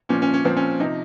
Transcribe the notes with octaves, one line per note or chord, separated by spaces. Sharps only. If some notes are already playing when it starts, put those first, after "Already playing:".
A#2 F3 C#4
C#4
C#4
A#2 F3 C4
C#4
C3 F3 D#4